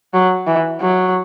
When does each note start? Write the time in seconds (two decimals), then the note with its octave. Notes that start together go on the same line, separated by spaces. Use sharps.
0.14 F#3
0.47 E3
0.81 F#3